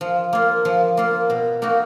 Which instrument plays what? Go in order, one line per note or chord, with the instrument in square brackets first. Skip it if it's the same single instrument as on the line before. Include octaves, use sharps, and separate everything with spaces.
[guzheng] F3
A#3 F4
F3
A#3 F4
B2
A#3 D#4 F#4